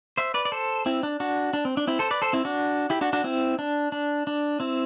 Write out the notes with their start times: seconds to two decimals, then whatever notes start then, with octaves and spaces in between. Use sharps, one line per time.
0.18 C5 E5
0.34 B4 D5
0.45 D5
0.52 A4 C5
0.86 C4 E4
1.03 D4
1.20 D4 F#4
1.53 D4
1.65 C4
1.77 D4
1.87 C4 E4
1.99 A4 C5
2.11 B4 D5
2.22 A4 C5
2.33 C4 E4
2.45 D4 F#4
2.90 E4 G4
3.01 D4 F#4
3.13 D4 F#4
3.24 C4 E4
3.59 D4
3.92 D4
4.27 D4
4.60 C4 E4